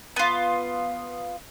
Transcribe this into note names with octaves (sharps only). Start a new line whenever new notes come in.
B3 F4